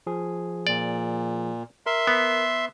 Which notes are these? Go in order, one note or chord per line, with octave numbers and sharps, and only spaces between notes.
F3 G#4
A#2 D5
A#4 E5 C6
B3